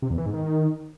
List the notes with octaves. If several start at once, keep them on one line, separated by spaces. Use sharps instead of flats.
C3
E2
E3
G#2
D#3